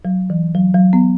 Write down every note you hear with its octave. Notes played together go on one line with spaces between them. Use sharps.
F#3
E3
F#3
F#3
B3